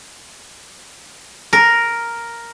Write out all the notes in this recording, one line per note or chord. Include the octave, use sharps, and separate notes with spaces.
A#4